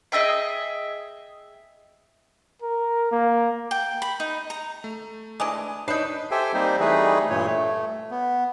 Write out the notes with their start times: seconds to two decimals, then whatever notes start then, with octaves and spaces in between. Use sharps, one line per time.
0.12 G#4 D#5 E5 G5
2.62 A#4
3.11 A#3
3.71 G5
4.02 B5
4.20 D#4
4.50 A#5
4.84 A3
5.40 E3 G#3 D4 D#5
5.88 D4 D#4 B4 C#5 D#5 G6 C7
6.31 G4 A4 C5 E5 G5 G#5
6.54 G3 A#3 C4 D#4 C5
6.80 E3 G3 A3 D#4 G#4 B4
7.30 G2 A#2 C#5
7.46 A3
8.11 B3